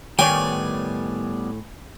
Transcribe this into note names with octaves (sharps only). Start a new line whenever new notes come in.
A2 D#3 G3 B3 C#5 D5 G5 G#5